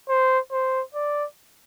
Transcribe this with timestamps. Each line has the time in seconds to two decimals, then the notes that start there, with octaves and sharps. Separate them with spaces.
0.09 C5
0.52 C5
0.94 D5